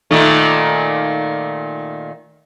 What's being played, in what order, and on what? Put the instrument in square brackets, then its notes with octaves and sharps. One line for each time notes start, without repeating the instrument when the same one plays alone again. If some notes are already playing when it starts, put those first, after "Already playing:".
[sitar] A#2 D#3 A3